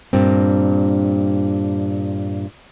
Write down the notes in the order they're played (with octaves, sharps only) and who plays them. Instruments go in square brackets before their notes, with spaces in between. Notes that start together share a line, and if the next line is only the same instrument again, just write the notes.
[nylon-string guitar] G2 A#2 C4